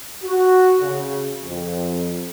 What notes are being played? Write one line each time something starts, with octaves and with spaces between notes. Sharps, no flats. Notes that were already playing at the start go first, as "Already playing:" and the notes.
F#4
C#3
F2